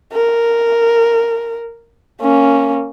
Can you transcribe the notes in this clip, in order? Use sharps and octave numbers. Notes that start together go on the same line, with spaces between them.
A#4
A#3 C#4